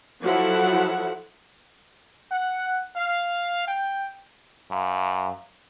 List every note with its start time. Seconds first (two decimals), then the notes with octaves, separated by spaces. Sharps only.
0.23 F3 F#3 E4 A4 F#5
2.31 F#5
2.96 F5
3.67 G5
4.71 F#2 F5